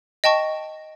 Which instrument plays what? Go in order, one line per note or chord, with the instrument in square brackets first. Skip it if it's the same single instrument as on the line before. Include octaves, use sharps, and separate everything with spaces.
[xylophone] D#5 G5 A5 C#6